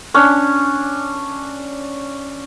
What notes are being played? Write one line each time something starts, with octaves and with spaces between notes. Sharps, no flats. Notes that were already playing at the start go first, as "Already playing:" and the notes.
C#4 D4